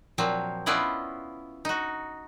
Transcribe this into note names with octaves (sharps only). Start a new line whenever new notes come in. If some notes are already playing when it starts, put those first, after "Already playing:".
A#2 F3 F#3 C4
B3 C#4 E4 F4 D5 D#5
D#4 F#4